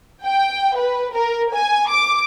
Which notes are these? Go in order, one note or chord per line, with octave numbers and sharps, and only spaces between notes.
G5
B4
A#4
G#5
D6